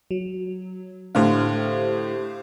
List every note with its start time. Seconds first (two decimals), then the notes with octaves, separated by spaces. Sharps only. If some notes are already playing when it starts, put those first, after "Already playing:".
0.11 F#3
1.15 A2 D3 G4 C5 F5